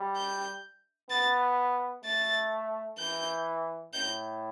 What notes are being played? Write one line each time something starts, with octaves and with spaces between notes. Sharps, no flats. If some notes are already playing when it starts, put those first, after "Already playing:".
Already playing: G3
G6
B3 A6
A3 A6
E3 G6
A2 G6